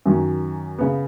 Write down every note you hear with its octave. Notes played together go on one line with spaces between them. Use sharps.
F#2 D#3 F#3 C#4
C#3 B3